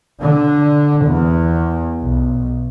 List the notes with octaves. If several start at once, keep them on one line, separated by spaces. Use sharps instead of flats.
D3
E2
B1